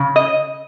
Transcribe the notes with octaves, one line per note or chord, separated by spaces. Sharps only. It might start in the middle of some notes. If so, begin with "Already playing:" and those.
Already playing: C#3
D#5